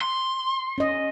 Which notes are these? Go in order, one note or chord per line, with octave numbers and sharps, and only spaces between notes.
C6
C#4 D#5